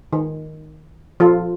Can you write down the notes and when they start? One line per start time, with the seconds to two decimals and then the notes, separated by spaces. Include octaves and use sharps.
0.13 D#3
1.20 F3 F4 A4